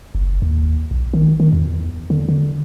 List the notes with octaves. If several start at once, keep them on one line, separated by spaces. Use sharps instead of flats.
F#1
D#2
A#1
D#3
D#3
E2
D3
D3